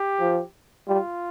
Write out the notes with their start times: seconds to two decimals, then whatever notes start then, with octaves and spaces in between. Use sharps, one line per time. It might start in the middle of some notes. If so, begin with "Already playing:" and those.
Already playing: G4
0.20 F3
0.88 G3 F4